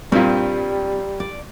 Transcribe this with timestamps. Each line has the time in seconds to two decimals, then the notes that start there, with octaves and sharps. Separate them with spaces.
0.12 G2 A#2 G3 C4
1.20 D5